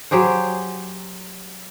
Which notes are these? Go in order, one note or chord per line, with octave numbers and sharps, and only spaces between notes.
F#3 G4 G#4 C5